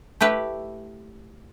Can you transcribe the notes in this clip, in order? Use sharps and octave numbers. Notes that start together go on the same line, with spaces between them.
A3 E4 G4 B4